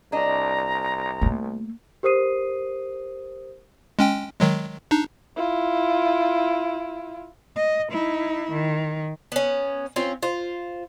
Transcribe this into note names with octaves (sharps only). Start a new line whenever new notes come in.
C2 D4 D#5 A#5
A3 A#3
G4 A#4 C5 D#6 C7 D#7
G#3 C#4 G5
D#3 F#3 G#3
D4 D#4
E4 F4
D#5
D#4 E4
D#3
B3 C#4
C4 C#4 F4
F4 C5